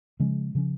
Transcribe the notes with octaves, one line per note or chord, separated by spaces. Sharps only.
C#3 F3 G#3 C#4
C#3 F3 C#4